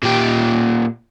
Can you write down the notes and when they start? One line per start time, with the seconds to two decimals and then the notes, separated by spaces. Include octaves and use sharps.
0.03 A#2 G4